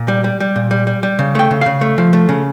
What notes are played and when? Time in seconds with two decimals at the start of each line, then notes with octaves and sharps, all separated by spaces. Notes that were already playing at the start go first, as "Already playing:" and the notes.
Already playing: A#2
0.08 G3
0.24 G3
0.40 G3
0.56 A#2
0.71 G3
0.87 G3
1.03 G3
1.19 C#3
1.35 A3 G5
1.51 C#3
1.61 C#3 F5
1.81 A3
1.98 F3
2.13 A3
2.29 C#3